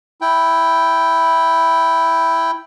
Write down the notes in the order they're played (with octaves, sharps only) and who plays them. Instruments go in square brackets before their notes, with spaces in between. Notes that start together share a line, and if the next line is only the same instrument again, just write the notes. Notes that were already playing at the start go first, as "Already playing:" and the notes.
[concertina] E4 G5